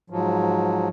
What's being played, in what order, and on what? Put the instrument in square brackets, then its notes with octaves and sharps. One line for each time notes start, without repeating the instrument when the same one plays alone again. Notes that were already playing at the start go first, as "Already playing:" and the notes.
[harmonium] G#2 F3 F#3